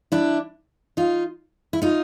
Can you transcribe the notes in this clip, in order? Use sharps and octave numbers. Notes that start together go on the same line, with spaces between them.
D4 E4
D#4 F4
E4
D#4 F4